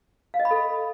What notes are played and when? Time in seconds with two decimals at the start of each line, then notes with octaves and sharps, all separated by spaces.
0.34 F5
0.40 D#5
0.45 B5
0.51 A4
0.56 B5